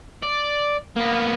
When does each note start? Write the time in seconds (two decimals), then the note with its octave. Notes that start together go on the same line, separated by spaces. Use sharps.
0.22 D5
0.97 A#3 B3